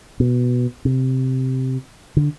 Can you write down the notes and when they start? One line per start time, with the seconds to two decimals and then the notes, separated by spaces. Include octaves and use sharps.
0.20 B2
0.85 C3
2.17 D3